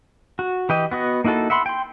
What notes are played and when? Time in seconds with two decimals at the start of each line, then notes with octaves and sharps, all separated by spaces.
0.39 F#4
0.69 E3 G4 D#5
0.91 B3 F#4 D#5
1.24 A#3 D#4 E4 F#4 A4
1.50 E5 F#5 B5 C6
1.66 G5 C6